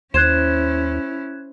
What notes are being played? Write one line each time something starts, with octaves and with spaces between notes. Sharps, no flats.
D#2 C#4 E4 C5 F#6 G#6 E7